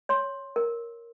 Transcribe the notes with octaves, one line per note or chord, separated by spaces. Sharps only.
C#5 C6
A#4